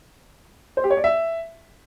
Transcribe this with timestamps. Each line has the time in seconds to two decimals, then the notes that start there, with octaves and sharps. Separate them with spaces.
0.77 C5
0.84 G4
0.90 C#5
0.97 D5
1.04 E5